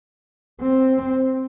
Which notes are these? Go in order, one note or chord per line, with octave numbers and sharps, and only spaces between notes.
C4